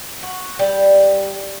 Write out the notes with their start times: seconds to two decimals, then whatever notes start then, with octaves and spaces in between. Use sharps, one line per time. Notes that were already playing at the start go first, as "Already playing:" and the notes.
0.23 F#4
0.59 G3